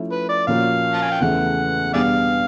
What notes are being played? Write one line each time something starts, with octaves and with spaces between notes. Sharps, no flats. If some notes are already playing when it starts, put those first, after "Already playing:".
Already playing: F3 A3 C#4 E4
B4
D5
A#2 F3 A#3 C#4 F#4 F5
A5
G#5
G5
E2 C#3 E3 A3 F#5
E2 B2 G3 B3 D4 G#4 D5 F5